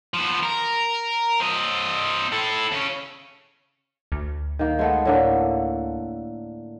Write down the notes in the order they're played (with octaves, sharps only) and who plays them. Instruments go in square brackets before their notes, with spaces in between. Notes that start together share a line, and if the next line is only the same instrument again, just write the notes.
[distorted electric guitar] F3 B3
A#4
C4 D#5
E4 A4
C#3 C#4
[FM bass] D2
[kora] D#3 A#3
G#3 A3 B3
A2 D3 A#3